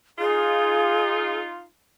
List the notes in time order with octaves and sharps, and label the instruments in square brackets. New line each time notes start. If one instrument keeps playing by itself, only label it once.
[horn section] D#4 F4 [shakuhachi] G#4